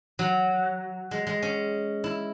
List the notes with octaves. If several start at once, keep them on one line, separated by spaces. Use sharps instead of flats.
F#3
G#3
G#3
C#4
E4